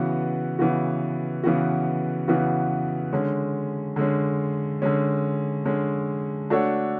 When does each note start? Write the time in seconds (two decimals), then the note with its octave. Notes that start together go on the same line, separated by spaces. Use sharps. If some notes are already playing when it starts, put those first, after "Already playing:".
Already playing: C#3 E3 B3 F#4
0.59 C#3 E3 B3 F#4
1.44 C#3 E3 B3 F#4
2.28 C#3 E3 B3 F#4
3.13 D3 G#3 C#4
3.96 D3 G#3 C#4
4.82 D3 G#3 C#4
5.65 D3 G#3 C#4
6.50 A3 D4 F#4 A4 C#5